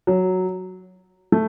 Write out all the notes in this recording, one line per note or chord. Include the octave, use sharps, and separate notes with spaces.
F#3
A3